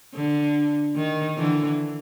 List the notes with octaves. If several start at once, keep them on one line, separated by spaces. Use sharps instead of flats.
D3
D#3
D3 E3